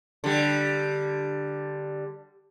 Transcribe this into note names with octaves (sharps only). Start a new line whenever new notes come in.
D3 G3